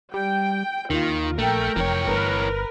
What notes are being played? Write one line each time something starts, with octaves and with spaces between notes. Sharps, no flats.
G3 G5
D#2 D#3 F4
A#1 A3 A#4 G5
F1 E3 C#5
G1 A#4 B4